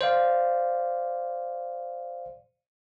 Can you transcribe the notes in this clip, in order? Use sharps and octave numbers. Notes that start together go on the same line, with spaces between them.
C5 D5 F5